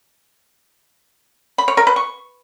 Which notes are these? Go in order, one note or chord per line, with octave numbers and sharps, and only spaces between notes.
B5
C#5
A#4
B4
C#6